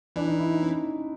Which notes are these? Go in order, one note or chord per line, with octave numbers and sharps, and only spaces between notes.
E3 D4
D#4
E4
D#4
C#4